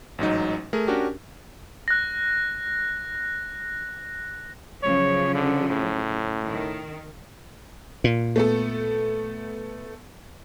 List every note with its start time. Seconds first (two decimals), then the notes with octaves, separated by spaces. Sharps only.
0.18 A1 G#2 F#3 D#4
0.73 A3 G#4 A#4
0.87 C#4 D4 F#4 G4 A#4
1.88 F#6 A#6
4.83 C#3 F3 F#3 C#5
5.35 D3
5.70 A2
6.46 D#3
8.04 A#2
8.36 A3 B3 A4